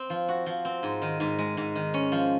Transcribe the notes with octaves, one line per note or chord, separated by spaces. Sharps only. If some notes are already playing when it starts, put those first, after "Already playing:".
Already playing: C4
F3
F#4
F3
C4
G#2
D#3
G#2
G#3
G#2
D#3
C#4
F3